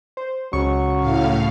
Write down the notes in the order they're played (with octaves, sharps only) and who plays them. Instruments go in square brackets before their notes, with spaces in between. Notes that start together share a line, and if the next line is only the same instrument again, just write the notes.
[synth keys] C5
[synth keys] C#2 C#3 C#6 [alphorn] F#3
[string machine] A2 F5